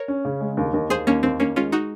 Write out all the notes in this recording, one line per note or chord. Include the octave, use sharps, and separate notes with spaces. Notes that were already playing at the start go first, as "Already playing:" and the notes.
Already playing: A#4 C#5
C#4
C#3
G#3
D#2
D#2
D#2 G#4 C5
D#2 A#3 C#4
D#2 C4
D#2 A#3 C#4
G#3 C#4 F4
D#4 F#4